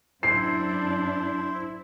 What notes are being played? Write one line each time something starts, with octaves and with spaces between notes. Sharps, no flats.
F#2 D4 E4 C5 C7